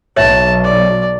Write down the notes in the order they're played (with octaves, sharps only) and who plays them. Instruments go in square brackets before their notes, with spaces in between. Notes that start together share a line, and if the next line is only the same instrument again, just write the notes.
[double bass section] B1 [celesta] C#5 E5 [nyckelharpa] A5
[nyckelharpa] D5